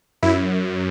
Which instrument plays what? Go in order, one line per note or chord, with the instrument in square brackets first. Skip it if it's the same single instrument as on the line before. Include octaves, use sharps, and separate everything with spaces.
[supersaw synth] F#2 E4